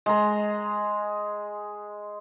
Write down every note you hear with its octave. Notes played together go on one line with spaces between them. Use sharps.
G#3 A#5